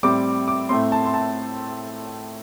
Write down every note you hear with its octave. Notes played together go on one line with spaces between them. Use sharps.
A2 G3 C4 D6
D6
A2 A3 C4 C6
A5
C6
A5